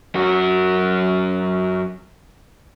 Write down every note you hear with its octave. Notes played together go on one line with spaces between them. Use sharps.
F#2 F#4